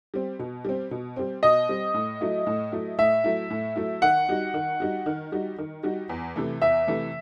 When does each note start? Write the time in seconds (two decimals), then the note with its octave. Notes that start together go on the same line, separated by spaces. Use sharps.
0.14 G3 C4
0.39 B2
0.65 G3 C4
0.91 B2
1.16 G3 C4
1.43 B2 D#5
1.69 G3 C4
1.94 A2
2.21 F#3 A3 E4
2.47 A2
2.72 F#3 A3 E4
2.98 A2 E5
3.24 F#3 A3 E4
3.50 A2
3.76 F#3 A3 E4
4.02 D#3 F#5
4.29 G3 D#4 F#4
4.54 D#3
4.80 G3 D#4 F#4
5.06 D#3
5.32 G3 D#4 F#4
5.58 D#3
5.83 G3 D#4 F#4
6.09 E2
6.36 C3 E3 A3
6.62 E2 E5
6.87 C3 E3 A3